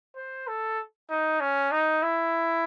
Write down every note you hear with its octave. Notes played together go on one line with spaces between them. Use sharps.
C5
A4
D#4
C#4
D#4
E4